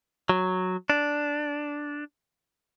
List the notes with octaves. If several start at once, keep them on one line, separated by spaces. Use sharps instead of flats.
F#3
D4